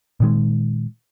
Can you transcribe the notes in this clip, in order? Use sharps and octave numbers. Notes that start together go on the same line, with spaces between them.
A#2 D#3 G#3